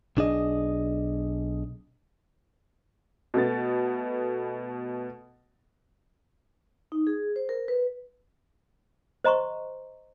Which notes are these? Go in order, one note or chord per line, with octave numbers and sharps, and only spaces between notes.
B1 D4 G#4 D#5
B2 A3 B3 A6
D#4
G#4
C5
A#4
B4
C5 D#5 A#5 C6 C#6